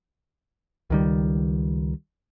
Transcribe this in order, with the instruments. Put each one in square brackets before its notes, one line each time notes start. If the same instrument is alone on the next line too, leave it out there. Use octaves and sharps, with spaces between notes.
[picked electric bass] C#2 D#3 G3